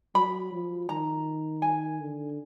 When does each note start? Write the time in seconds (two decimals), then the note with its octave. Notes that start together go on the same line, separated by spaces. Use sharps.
0.15 F#3 B5
0.53 F3
0.89 D#3 A#5
1.62 G#5
2.00 D3